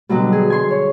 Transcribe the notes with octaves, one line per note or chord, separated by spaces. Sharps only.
B2 D3 F#3 G3
G#4
G#5 C6
C#5